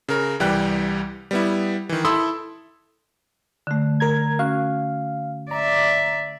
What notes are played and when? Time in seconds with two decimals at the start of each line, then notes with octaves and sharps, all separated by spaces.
0.08 C#3 A#4
0.40 C2 E3 G3 G5 F#6
1.31 G3 B3 E4
1.89 D#3 E3
2.05 E4 A4 B5 C6 D#6 E6
3.67 D3 A3
4.00 A#4 A#5 G#6
4.39 C#4 F#4 F5
5.51 D5 E5 A#5